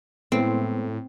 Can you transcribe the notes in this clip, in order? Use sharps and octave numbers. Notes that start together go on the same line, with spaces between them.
A2 G#3 B3 C4 C5